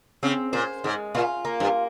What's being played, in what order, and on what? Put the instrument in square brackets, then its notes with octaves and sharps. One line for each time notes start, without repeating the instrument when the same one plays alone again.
[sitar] C#3 [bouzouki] C4
[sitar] A#2 [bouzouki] C5
[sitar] G#2 [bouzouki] G#3
[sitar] A#2 [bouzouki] F4
[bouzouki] A#3
[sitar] G2